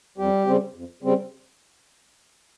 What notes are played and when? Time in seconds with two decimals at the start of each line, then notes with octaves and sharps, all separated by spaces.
0.18 F2 G3 G4
0.46 C#3 G3 C4
0.74 F2
1.03 C#3 G3 C4